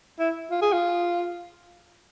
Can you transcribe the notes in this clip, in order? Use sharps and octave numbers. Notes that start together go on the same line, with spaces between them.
E4
F4
G#4
F4